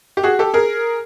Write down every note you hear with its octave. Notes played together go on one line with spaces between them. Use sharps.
G4
F#4 G#4
G4 A4
G#4 A#4